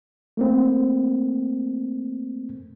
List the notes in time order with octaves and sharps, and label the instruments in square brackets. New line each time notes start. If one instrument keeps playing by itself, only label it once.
[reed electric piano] A3 A#3 C4